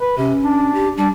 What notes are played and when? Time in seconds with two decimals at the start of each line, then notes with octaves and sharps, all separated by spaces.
0.01 B4
0.18 C3 C#4
0.44 D4
0.74 G4
0.97 G3 D4